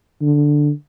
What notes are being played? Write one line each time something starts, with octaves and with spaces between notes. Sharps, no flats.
D3